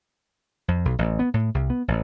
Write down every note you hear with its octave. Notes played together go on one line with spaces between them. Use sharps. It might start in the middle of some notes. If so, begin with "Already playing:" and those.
F2
B1
A1
B3
A2
C2
B3
A1